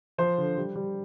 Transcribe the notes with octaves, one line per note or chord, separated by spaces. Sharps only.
F3 C5
D3
G3
G3